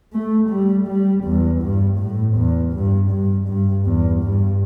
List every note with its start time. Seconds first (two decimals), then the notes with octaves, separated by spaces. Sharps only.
0.13 A3
0.50 G3
0.87 G3
1.25 E2
1.62 G2
1.99 A2
2.36 E2
2.73 G2
3.11 G2
3.48 G2
3.85 E2
4.23 G2